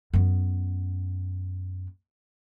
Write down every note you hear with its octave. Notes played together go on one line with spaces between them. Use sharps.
F#2 B3